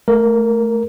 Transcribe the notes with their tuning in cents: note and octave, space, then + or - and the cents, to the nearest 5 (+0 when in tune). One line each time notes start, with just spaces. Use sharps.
A3 -10 A#4 +0